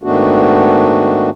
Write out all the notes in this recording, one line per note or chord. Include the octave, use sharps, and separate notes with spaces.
G#2 D#3 A3 B3 D4 F#4